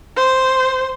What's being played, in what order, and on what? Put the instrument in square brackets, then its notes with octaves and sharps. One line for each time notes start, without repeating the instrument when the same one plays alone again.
[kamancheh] C5